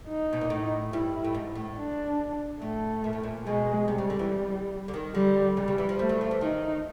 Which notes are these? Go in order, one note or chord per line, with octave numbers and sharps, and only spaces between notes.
D#4
B2
A#2
A2
G2 E4
A2
G#2
A2
D4
A2 A3
A#2
A2
A#2
B2 G#3
C3 G3
C#3
D3
E3
D3
D#3
D3 G3
C#3 G3
C#3
E3
F3
G3 A3
F#3
F3
E3
D#3 D#4